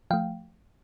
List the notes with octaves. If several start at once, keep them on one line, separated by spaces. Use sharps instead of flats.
F3 A3 F5 G5